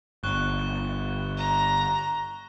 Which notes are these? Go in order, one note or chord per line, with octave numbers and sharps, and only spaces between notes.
G1 C#6 F#6 G7
A#5